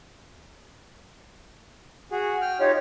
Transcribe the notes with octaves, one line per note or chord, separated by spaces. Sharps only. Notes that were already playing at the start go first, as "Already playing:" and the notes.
F#4 G#4
G5 F6
D#4 F4 G4 C#5